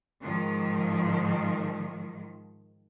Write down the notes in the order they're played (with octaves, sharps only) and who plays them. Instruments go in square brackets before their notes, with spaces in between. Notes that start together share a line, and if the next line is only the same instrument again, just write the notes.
[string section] G#2 D#3 F3